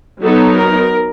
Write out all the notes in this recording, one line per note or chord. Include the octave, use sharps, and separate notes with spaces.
F#3 B3 D#4 A4
A#4